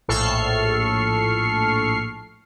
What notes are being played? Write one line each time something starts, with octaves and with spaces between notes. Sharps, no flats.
A#1 A2 A4 C#6 F6 C7